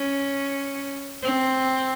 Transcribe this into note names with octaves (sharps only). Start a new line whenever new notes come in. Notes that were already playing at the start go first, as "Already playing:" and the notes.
Already playing: C#4
C4